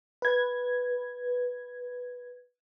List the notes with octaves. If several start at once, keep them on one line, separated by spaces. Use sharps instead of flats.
B4 G#6